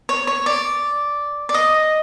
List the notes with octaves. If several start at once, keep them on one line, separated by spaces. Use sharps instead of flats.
C#5
C#5
D5
D5
D#5